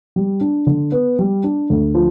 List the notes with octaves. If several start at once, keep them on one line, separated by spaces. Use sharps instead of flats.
G3
D4
D3
B3
G3
D4
D2
F3